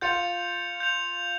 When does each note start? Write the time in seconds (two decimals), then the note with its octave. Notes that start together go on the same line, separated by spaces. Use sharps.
0.01 F4 G6 C#7 F7
0.80 G6 C#7 F7